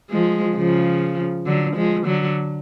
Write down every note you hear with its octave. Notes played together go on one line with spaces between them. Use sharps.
F3 G#3
C#3 F3
D3 F#3
F3 G#3
D3 F#3